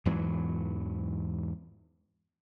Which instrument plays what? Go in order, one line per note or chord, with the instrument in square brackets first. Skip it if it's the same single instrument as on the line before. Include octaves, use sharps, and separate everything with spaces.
[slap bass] E2 G#2 E3 F#3